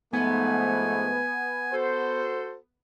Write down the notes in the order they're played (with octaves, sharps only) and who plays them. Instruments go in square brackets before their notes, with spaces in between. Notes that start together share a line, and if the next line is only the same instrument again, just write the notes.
[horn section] G#2 F3 A3 [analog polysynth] B3 [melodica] G#5
[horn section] F#4 A4 C5